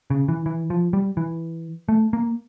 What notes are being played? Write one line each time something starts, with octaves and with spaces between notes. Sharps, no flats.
C#3
E3
E3
F3
G3
E3
A3
A#3